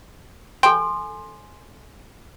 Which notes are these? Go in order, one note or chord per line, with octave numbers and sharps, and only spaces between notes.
A4 G5 G#5 C6